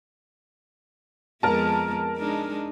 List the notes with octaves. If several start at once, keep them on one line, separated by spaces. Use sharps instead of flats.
F2 G#3 B3 A#4 A5
G#3 D4 D#4